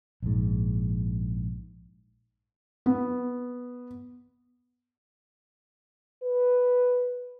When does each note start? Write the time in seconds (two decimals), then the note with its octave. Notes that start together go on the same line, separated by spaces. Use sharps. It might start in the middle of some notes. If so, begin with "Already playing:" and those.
0.23 A#1 G#2
2.86 B3
6.23 B4